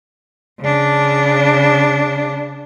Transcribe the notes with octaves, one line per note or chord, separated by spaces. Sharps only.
C#3 D4